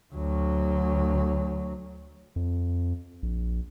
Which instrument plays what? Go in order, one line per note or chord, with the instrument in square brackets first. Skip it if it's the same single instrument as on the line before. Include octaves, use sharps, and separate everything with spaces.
[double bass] D2 F#3
[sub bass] F2
A#1